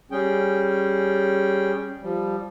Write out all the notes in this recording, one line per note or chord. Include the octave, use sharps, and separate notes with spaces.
G3 C#4 G#4 G5
F3 G3